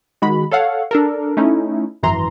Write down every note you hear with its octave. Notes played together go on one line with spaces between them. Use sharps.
D#3 G#3 F#4 B5
A4 C#5 F5 F#5
D4 A4 A#4
A3 C#4 D#4 E4
G#1 F#2 E3 A#5 C6